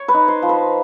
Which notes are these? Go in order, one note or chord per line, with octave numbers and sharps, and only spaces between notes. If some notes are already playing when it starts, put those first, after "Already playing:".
Already playing: C#5
B4
D#4
C5
F3
B4